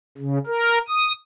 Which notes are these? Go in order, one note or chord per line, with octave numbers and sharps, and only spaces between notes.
C#3
A#4
D#6